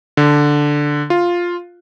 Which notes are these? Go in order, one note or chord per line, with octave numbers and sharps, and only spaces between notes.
D3
F4